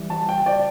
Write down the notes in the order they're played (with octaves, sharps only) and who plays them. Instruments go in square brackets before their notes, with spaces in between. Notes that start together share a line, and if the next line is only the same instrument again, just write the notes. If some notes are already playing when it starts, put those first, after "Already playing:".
Already playing: [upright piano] E3 G3
A5
G5
D5